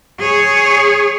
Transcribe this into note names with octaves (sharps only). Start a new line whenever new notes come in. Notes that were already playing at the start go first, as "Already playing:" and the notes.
G#4 C#5